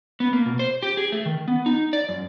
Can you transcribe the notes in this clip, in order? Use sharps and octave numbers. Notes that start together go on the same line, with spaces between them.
B3
A#3
B2
C5
G4
G#4
A3
D#3
B3
D#4
D5
F#2